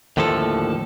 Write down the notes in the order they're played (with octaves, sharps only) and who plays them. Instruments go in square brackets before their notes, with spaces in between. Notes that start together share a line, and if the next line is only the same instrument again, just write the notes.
[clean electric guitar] D#2 A2 D3 F3 A4